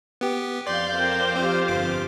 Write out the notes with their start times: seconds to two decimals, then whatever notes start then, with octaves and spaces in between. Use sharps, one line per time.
0.21 B3 G4
0.67 F2 D5 F5 C6 G6
0.98 A#4 C5 G5
1.36 C4 F4 G4
1.68 G1 D6